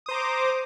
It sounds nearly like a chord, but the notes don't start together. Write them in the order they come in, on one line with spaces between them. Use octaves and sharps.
D#6 C5 A#5 D6